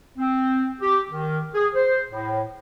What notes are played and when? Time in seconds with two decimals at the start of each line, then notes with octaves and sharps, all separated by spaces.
0.18 C4
0.81 G4
1.11 D#3
1.54 G#4
1.74 C5
2.09 A2